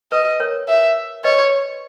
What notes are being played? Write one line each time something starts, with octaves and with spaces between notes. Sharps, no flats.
B4 D#5
A#4 C#5
E5
B4 C#5 D#5